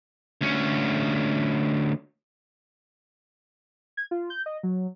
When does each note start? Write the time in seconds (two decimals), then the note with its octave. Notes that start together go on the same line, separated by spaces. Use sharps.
0.41 D2 C#4
3.97 G#6
4.11 F4
4.30 G6
4.46 D#5
4.63 F#3